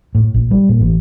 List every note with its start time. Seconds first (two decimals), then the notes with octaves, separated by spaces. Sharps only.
0.15 A2
0.34 A#1
0.51 G3
0.69 A#2
0.81 A1